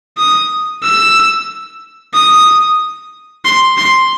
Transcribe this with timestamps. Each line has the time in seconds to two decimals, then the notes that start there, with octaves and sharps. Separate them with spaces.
0.18 D#6
0.83 E6
2.13 D#6
3.45 C6
3.78 C6